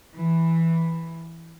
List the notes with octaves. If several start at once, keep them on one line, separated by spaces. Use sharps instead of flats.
E3